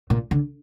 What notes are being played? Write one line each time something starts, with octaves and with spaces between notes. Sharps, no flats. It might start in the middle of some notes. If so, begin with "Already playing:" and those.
A#2
D3